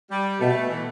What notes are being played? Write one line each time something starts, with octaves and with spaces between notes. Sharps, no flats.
G3
B2 A3
E3